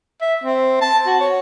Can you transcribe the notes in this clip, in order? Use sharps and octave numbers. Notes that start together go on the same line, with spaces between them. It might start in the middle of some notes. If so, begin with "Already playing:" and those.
E5
C4
A5
F#4
C#5